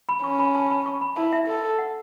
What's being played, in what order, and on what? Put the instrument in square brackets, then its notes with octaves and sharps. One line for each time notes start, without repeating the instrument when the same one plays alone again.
[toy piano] B5
[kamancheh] C#4 [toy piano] C#6
[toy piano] B5
A5
B5
C#6
B5
[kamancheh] E4 [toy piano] A5
[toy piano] E5
[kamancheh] A4
[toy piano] F#5